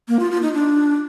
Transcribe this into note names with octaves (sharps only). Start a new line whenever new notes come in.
A#3
F4
F4
D#4
D4